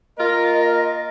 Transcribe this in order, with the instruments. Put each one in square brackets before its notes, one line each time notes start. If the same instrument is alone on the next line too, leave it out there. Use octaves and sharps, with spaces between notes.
[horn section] A#3 F4 A#4 [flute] D#5